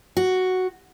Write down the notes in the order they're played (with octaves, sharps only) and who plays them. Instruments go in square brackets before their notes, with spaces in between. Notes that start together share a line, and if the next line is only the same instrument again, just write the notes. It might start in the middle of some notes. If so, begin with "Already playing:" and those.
[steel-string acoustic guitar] F#4